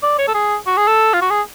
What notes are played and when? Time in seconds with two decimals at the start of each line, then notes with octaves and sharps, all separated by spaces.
0.03 D5
0.18 C#5
0.28 A4
0.34 G#4
0.67 F#4
0.77 G#4
0.88 A4
1.13 F4
1.21 F#4
1.30 G#4